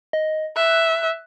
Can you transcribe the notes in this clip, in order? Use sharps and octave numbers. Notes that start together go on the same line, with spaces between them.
D#5
E5 F#6